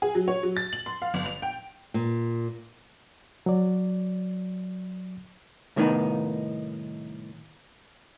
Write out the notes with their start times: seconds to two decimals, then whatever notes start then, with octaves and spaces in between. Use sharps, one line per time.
0.02 G#4
0.15 F#3
0.28 C#5
0.43 F#3
0.57 A6
0.73 F#7
0.86 C6
1.02 F5
1.14 G1
1.26 F7
1.42 G5
1.94 A#2
3.46 F#3 D5
5.76 C2 A2 D#3 B3 C4 D#4